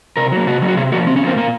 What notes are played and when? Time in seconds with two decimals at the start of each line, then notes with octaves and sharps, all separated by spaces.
0.17 C3 A#4
0.32 F#3 A#3
0.47 C3 F#4
0.62 F#3 A#3
0.68 F#4
0.77 C3 G#4
0.92 F3 A#3 F#4
1.07 C3 C4
1.16 C#4
1.22 F3 A#3 C4
1.36 A#2 A#3